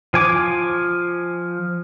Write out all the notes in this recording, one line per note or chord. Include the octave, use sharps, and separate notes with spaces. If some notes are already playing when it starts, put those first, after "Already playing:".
F3 G#5 D6